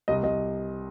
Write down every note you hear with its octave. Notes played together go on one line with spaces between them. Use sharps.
C2 D#5
C2 D#5